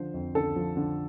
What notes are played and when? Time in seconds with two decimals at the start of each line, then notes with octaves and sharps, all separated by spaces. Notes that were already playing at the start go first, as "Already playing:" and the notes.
Already playing: D3 F3 C5
0.14 F2
0.35 D3 A4
0.56 F3
0.77 D3